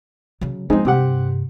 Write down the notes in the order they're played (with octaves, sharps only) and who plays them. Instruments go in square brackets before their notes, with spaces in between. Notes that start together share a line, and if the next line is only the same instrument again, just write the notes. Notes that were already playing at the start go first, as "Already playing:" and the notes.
[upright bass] C#3 F#3
[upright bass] F3 B3 [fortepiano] G#3 C4 D#4
[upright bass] G2 C3 [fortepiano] C4 G4 F#5